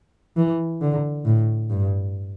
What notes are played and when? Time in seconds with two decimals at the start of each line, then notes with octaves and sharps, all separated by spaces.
0.37 E3
0.82 D3
1.26 A2
1.70 G2